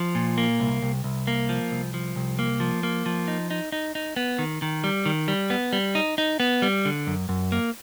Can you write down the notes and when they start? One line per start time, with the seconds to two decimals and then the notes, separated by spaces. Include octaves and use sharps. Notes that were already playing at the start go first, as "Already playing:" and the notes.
Already playing: F3
0.15 A#2
0.38 A#3
0.60 C2
0.82 C2
1.04 C2
1.27 A#3
1.49 F3
1.71 C2
1.94 F3
2.16 C2
2.39 A#3
2.60 F3
2.83 A#3
3.06 F3
3.28 D#4
3.51 D#4
3.72 D#4
3.95 D#4
4.16 B3
4.39 D#3
4.62 D#3
4.84 G3
5.06 D#3
5.28 G3
5.50 B3
5.73 G3
5.95 D#4
6.18 D#4
6.40 B3
6.62 G3
6.85 D3
7.07 F#2
7.29 F#2
7.52 A#3